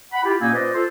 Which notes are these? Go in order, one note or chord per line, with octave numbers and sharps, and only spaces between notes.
F#5 B5
E4 F4 G4
A#2 A#3 C#4 D#4 G#5 E6
F4 B4 C5 D5 D#5
F4 A4 C5